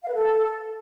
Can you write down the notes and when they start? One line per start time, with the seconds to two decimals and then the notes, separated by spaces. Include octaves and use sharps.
0.03 F5
0.08 B4
0.14 A4